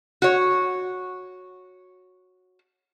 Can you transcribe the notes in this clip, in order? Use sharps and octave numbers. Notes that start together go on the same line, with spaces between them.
F#4 C#5